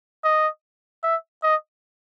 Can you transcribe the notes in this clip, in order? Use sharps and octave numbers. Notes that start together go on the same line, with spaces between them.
D#5
E5
D#5